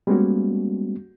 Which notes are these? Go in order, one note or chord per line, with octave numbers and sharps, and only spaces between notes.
G3 G#3 A#3 B3 C#4 F#4